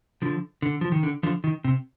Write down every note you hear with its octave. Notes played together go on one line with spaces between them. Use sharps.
D3 F3
D3
F3
D#3
D3
D3 F3
D#3
C3